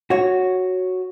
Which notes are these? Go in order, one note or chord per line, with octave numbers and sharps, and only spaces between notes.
F#4 C#5